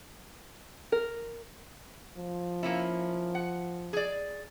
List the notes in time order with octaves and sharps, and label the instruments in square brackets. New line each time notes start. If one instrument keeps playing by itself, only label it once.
[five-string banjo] A#4
[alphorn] F3
[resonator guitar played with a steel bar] A#3 C#4 E4
F#5
G#4 D5